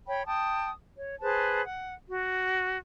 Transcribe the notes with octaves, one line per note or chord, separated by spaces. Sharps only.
C#5 G5 B5
G5 A5 D#6
C#5
G#4 B4 C5 A5
F#5
F#4